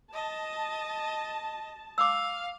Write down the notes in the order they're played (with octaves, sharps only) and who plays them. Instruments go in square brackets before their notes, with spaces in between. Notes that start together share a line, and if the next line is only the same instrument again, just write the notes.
[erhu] D#5 [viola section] A5
[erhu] F5 [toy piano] D6 E6